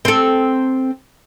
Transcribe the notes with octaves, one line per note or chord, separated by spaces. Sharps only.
C4 A4